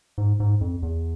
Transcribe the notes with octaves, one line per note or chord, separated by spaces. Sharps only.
G#2
G#2
F2
E2